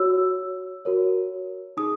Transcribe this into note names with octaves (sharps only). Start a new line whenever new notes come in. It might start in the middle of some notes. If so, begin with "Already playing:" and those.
Already playing: F#4 C#5 E6
F#4 A#4 C#5
D#4 G#4 D#6